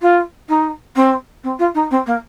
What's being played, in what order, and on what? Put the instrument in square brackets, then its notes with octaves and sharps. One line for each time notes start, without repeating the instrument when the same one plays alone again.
[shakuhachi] F4
D#4
C4
C4
F4
D#4
C4
A#3